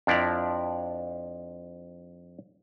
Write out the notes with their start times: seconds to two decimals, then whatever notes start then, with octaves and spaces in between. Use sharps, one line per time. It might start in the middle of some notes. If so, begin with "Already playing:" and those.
0.07 F2 F3 D4 E4 D5 A#5